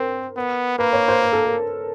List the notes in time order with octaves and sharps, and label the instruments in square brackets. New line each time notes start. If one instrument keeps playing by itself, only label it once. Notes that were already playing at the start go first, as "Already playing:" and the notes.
Already playing: [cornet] C4 [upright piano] A#4 C5
[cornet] B3
[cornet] A#3 [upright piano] B4
[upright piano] C#5
C5
A#4
A4
A#4